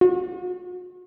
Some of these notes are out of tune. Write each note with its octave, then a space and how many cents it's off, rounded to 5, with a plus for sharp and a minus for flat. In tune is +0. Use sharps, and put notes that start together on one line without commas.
F#4 -40